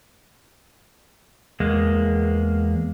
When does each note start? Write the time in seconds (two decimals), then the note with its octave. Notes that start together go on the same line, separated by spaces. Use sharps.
1.60 E2 G#3 A#3